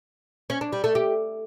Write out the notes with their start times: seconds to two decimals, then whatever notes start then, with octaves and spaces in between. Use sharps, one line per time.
0.50 C#4
0.61 D4
0.72 G3
0.84 A3
0.95 G4